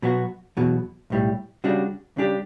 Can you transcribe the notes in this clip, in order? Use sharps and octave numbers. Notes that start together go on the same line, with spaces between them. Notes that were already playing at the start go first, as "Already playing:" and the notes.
B2 F#3 B3 F#4
E2 B2 F#3
B1 A2 G3
C#3 G3 D4 F#4
C#3 G3 D4 G4